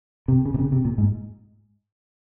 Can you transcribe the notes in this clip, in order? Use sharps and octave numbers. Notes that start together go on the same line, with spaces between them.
C3
C#3
C3
C#3
C3
A#2
G#2